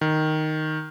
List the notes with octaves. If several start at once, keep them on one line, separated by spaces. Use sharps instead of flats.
D#3